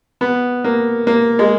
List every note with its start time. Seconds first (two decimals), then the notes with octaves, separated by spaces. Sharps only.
0.21 B3
0.64 A#3
1.07 A#3
1.39 G#3